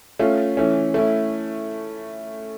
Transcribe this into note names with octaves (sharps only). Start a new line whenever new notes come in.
A3 C#4 F4
E3 A3 C#4
A3 C#4 E4